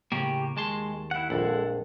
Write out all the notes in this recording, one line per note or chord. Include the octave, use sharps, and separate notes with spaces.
A2 C#3 A#3 G4
D#2 G#3 A5 C6
E4 F#5
A#1 F2 G#3 A4 F#5